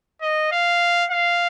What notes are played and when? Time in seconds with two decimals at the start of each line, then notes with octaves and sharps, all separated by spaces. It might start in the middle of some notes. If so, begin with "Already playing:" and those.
0.22 D#5
0.52 F5
1.11 F5